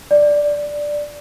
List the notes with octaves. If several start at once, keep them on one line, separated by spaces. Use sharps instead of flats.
D5